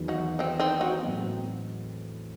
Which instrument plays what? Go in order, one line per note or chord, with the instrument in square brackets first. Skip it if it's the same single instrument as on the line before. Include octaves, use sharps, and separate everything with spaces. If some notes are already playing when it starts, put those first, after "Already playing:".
Already playing: [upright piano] E2 D#3 F#3
[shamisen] D#4 F#4
C4 D#4
C4 D#4
D#4 F#4
[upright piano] A2 F#3 C4